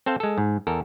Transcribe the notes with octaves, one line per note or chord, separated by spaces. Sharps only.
C4 A4 C5 F5
G#3 A4
G#2
E2 A4 A#4